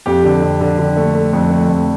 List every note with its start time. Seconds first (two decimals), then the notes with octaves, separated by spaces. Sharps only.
0.06 F2 G4
0.24 D3
0.42 F2
0.61 D3
0.79 D3
0.97 A3
1.15 A3
1.33 F2
1.51 A3
1.69 F2